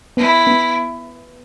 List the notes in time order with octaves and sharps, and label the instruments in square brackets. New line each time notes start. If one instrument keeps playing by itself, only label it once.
[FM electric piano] B3 [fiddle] E4
[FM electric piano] B3